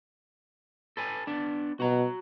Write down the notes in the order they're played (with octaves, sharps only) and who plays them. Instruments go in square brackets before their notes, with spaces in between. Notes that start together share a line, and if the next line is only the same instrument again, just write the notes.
[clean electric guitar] A4 B4 G#5
B3 D4
[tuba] B2 [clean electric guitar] F#4 A#5